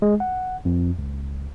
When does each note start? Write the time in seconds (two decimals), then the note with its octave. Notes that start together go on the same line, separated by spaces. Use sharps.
0.02 G#3
0.20 F#5
0.65 F2
0.99 C#2